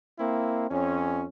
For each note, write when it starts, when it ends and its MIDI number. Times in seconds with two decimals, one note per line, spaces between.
0.19 0.66 58
0.19 0.66 60
0.19 0.66 64
0.71 1.25 41
0.71 1.25 61